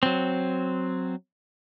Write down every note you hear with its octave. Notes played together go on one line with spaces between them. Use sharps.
F#3 C4